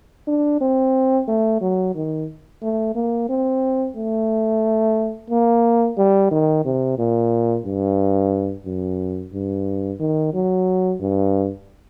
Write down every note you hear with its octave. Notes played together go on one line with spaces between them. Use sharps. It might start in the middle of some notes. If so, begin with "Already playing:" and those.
D4
C4
A3
F#3
D#3
A3
A#3
C4
A3
A#3
G3
D#3
C3
A#2
G2
F#2
G2
D#3
F#3
G2